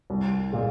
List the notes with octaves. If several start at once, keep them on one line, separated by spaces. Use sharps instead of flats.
C2
A#2 G#3